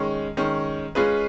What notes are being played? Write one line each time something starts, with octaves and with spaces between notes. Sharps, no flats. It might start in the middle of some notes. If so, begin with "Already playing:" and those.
Already playing: D#3 G#3 C#4
D#3 G#3 C#4
G#3 C#4 F4 G#4 B4